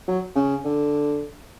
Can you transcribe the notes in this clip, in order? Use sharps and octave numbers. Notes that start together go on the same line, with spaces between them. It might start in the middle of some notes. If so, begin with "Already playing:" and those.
F#3
C#3
D3